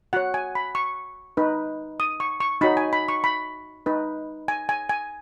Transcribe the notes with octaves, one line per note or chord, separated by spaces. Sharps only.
F#4 C#5 F#5
G#5
B5
C#6
D#4 B4
D#6
C#6
C#6
D#4 F#4 C#5 B5
G#5
B5
C#6
B5
D#4 B4
G#5
G#5
G#5